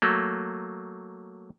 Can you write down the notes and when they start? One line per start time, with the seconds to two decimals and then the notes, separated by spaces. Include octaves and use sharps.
0.02 F#3 A3 A#3